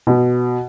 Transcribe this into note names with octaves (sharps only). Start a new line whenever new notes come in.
B2